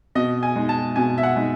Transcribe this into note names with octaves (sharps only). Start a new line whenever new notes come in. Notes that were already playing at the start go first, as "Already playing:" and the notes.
B2 D#5
G#5
G#3 D#4
A5
B2 G#5
E5
F#5
G#3 D#4